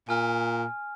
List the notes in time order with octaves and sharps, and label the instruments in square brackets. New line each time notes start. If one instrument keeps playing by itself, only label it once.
[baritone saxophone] A#2 [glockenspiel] G#5 F6